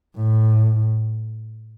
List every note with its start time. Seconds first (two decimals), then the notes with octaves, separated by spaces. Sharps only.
0.16 A2